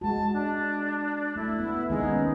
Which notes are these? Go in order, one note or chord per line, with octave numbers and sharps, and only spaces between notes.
G#3 F#4 A5
D4
A3 E4
B3
D#3 G#3 B3 D#4
C#4